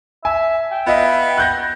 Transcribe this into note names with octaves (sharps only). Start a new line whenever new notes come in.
E5 G#5
G5
B3 F4 D#5 E5
F#6 G6 A#6